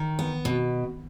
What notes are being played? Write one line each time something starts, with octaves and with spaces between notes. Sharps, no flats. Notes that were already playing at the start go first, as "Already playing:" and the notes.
Already playing: D#3
B3
B2